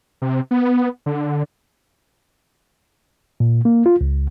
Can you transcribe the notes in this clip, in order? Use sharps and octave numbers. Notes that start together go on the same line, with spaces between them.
C3
B3
D3
A#2
A#3
F4
C#2